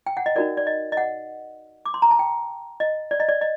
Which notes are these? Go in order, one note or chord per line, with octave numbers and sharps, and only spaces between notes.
G5
F#5
D#5
D#4 F#4 A#4 D5
D5
D#5
D#5
F#5
D6
C6
A#5
A5
G5
D#5
D5
D#5
D5
D#5